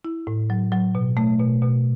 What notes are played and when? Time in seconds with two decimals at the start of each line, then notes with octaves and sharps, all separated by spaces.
0.05 E4
0.27 A2
0.50 F#3
0.72 F#3
0.95 B2
1.17 A3
1.40 B2
1.62 B2